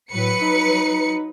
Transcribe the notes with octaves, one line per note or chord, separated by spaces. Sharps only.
A2 F#3 B4 C#7
D#4